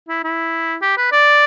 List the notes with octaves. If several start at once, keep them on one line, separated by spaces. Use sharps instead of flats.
E4
E4
G4
B4
D5